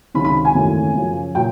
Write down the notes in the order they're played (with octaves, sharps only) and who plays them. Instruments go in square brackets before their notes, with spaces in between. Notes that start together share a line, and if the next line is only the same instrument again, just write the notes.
[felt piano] C#2 C3 D#3 F#3 B5
B5
G#5
G#1 F#2 C#3 E3 A3
F#2 C#3 F3
A#2 F#3 G5